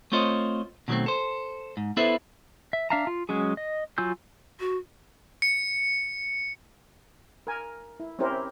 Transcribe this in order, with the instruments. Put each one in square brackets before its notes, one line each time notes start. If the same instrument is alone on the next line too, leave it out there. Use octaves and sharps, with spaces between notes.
[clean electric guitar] A3 C4 F4 C5 C#5 D#5
B2 D#3 F#3 G#3 A3 C4
A4 C5
G#2
B3 E4 A4 B4 C5 E5
[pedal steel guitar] E5
D4 E5 F5 A5 A#5
F4
F#3 G#3 C#4 G#4
D#5
F#3 F4 G#5 E6 G6
[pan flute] F#4
[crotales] C#7
[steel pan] A#4 G#5
E4
C4 C#4 E4 G4 A#4 C5